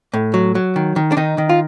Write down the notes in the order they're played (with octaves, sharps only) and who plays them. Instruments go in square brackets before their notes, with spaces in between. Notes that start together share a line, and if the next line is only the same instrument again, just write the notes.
[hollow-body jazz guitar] A2
F#3
F#3
D#3
D#3
D4
D#3 D#4
D#3
F4